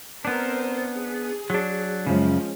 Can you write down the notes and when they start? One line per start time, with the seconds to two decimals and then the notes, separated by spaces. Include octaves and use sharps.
0.25 B3 C4 D4 A#4 C5
0.97 G#4
1.50 F#3 D4
2.07 F#2 C#3 F3 G#3 C#4